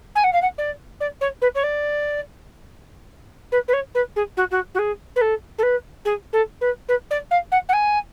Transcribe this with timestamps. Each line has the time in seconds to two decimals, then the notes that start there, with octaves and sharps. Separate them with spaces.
0.15 G#5
0.24 F#5
0.33 F5
0.42 F#5
0.58 D5
1.00 D5
1.21 C#5
1.41 B4
1.55 C#5
1.63 D5
3.52 B4
3.68 B4
3.73 C#5
3.95 B4
4.16 G#4
4.37 F#4
4.51 F#4
4.74 F#4
4.79 G#4
5.16 B4
5.21 A4
5.58 A4
5.63 B4
6.05 G#4
6.33 A4
6.61 B4
6.88 B4
7.11 D5
7.31 F5
7.52 F#5
7.69 F#5
7.73 G#5